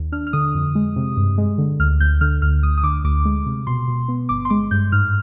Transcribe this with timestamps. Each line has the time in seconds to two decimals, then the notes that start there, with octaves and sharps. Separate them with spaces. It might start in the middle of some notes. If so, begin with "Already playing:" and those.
Already playing: D#2
0.12 D4 F6
0.27 F6
0.33 D3 D#6
0.55 F2
0.75 G#3
0.96 C3
1.17 G2
1.38 G#3
1.58 D3
1.79 D2 F6
2.00 D2 G6
2.21 D3 F6
2.42 D2 F6
2.63 D2 D#6
2.78 D#6
2.83 D3 D6
3.04 D2 D6
3.25 G#3
3.46 C3
3.67 B2 C6
3.88 B2
4.08 B3
4.29 G1 D6
4.45 C6
4.50 G#3 D6
4.71 G2 G6
4.92 G#2 F6